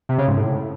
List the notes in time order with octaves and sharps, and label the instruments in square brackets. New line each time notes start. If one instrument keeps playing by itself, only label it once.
[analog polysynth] C3
C#3
G#2
A2